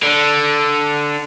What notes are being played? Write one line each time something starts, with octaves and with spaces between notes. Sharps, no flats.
D3